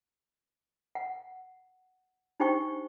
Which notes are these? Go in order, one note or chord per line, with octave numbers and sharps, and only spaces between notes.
F#5
D4 D#4 G4 C5 G5 C#6